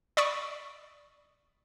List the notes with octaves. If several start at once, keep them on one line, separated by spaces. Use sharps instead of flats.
D5 B5 C#6 D#6